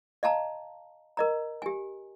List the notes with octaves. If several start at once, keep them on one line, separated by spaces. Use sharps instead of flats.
D#5 F5 A5 A#5
A#4 D#5 A#5
G4 G#5